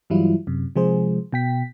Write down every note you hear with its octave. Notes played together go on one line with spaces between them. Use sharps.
G2 E3 F#3 G3 E4 F4
F#2 C3
C3 F3 G#3 G#4 C5
B2 G5 B6